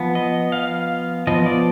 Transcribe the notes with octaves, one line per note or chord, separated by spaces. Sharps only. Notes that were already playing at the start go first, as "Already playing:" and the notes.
Already playing: F3 B3
D#5
F5
F3 B3 D#5
D5